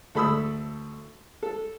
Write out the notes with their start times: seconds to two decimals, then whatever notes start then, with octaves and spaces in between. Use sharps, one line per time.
0.15 D2 A4 B5 D#6 E6
1.43 A4